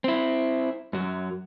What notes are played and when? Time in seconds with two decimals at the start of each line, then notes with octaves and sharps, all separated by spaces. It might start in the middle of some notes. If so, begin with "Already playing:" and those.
0.04 C4 E4
0.93 F#2 F#3